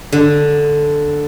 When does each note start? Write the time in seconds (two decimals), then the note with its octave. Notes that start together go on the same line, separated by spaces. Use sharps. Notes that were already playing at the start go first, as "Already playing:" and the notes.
0.12 D3